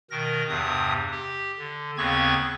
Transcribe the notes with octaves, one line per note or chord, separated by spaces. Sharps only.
B2 D#3 A#4 A#6
E2 G2 C3 D#6
G4
D3
D#2 C#3 B3 C4 C#6 G#6